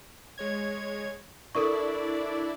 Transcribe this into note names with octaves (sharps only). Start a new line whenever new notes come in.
G#3 C#5 G#6
D4 E4 A4 A#4 D5 C#6